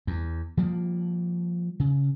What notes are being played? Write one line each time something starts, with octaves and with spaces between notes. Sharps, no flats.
E2
F3 G3 A#3
C#3